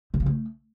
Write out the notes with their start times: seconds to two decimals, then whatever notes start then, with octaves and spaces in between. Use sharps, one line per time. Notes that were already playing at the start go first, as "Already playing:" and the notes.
0.14 C3
0.20 C#3
0.26 A3